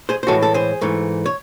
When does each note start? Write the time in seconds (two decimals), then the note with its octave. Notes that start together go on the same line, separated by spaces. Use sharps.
0.09 G#4 C5
0.23 C5
0.27 A2 E3 G#3 F#4 A4
0.42 A4
0.54 G#4 C5
0.81 G#2 E3 A3
1.26 C#5